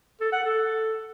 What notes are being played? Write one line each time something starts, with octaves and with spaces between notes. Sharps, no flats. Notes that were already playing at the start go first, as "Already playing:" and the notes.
A4
F#5
A4